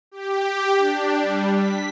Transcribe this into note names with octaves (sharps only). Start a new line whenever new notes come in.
G4
D4
G3
B6